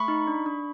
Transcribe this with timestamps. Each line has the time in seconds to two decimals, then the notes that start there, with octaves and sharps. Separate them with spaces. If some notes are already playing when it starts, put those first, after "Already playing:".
Already playing: A3 B5 C#6
0.08 D#4
0.27 D4
0.46 D4